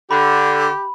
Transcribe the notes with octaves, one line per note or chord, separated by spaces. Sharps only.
D3 G4 B5